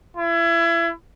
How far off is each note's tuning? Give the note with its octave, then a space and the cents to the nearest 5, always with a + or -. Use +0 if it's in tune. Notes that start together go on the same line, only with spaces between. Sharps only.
E4 +30